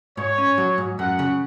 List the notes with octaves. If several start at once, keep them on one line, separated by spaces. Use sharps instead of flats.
G#2 C#5
C#4
F#3
G#2
F#2 F#5
C#3